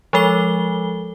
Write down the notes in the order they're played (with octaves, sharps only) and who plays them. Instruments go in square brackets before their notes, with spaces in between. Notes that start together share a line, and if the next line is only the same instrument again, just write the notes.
[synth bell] F3 G#3 A4 G7